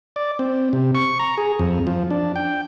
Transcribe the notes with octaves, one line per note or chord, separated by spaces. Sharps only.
D5
C4
C3
C#6
A#5
G#4
F2
F3
D4
G5